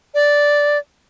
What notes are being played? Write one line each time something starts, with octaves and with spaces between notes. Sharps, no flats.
D5